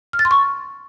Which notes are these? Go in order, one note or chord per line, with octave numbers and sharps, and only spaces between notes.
F6
A6
C6
C#6